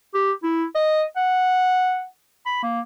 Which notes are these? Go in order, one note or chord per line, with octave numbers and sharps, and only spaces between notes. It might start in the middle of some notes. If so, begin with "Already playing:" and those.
G4
E4
D#5
F#5
B5
A#3